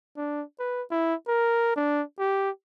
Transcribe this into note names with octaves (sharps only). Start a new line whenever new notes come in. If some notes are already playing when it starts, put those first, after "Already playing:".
D4
B4
E4
A#4
D4
G4